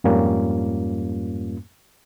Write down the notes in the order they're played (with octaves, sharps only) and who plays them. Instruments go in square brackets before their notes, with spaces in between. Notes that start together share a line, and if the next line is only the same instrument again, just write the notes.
[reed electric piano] F2 G#2 G3 A#3 C#4 F4